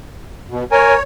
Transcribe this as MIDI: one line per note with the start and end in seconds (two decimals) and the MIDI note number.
0.50 0.64 47
0.72 0.94 70
0.72 1.03 73
0.72 0.94 80